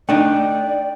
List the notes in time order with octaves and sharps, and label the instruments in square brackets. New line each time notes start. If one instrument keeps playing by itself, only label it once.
[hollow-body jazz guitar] A3 D4 D#4 [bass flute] D5 [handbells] G5